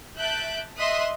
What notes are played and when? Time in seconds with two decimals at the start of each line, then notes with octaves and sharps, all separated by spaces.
0.18 E5 A5 F#6 G6 D7
0.78 D#5 E5 C6 D#6 F#6 B6